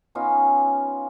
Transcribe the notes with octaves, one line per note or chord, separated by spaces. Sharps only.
B3 C#4 D#4 F4